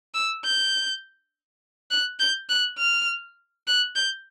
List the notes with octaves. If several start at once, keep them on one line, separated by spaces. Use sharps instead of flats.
E6
G6
F#6
G6
F#6
F6
F#6
G6